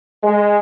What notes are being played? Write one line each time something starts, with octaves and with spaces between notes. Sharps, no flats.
G#3